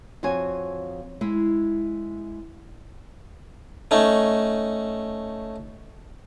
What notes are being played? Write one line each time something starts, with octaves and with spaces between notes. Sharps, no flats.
F2 F#4 C5 C#5 G#5
G#3 E4
A3 C#4 D#4